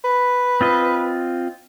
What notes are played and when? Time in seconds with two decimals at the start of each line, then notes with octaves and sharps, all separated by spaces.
0.04 B4
0.61 C4 F4 D#5